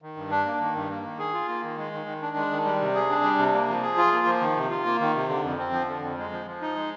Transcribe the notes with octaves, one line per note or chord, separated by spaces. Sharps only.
D#3
G2
D4
A#3
D#3
G2
A#3
D#3
G#4
F4
A#3
D#3
G#3
D#3
D#3
D4
G#3
D#3
G3
C3
G#4
D4
G3
C3
A#3
F3
G#4
F4
A#3
F3
D#3
C3
F4
A#3
D#3
C3
D3
F2
C4
F3
D3
F2
G#3
F3
F3
D#4
G#3